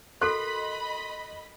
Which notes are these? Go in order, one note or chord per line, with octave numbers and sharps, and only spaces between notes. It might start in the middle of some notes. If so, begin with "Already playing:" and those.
F#4 A4 A#4 D#5 B5 C6 F#6